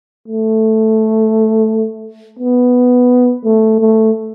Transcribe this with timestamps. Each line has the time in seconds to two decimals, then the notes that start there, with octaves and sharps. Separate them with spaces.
0.28 A3
2.39 B3
3.44 A3
3.80 A3